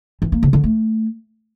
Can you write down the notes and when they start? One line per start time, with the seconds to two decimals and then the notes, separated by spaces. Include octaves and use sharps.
0.22 E3
0.32 A#3
0.43 C#3
0.53 D3
0.64 A3